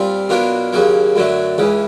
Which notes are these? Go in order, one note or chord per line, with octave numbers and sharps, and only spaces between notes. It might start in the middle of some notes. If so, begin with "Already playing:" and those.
Already playing: A#2 G3 C4 F4
B2 F#3 A#3 D4 F4
D#2 C#3 F#3 A#3
F#2 D3 F#3 A3
C#2 C#3 E3